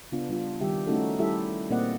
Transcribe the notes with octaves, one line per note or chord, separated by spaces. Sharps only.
C#3 B3 D4 F4
G3 D4 F4
D#3 G3 G4 E5
A3 C#4 D#4 E4 F#4 A4
G3 E4 G4 A4 E5
A#2 A#3 C4 D5 D#5 F#5